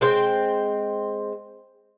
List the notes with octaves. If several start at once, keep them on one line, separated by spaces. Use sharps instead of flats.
G#3 C4 C5 G5